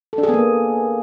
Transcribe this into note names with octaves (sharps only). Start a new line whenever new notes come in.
A4
D4
G#4
B3
A#3